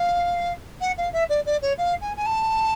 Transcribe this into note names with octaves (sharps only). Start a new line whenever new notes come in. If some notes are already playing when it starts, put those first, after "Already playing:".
Already playing: F5
F#5
F5
E5
D5
D5
C#5
F5
G#5
G#5
A5